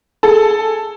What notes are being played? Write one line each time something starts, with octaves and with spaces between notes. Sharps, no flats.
G#4 A4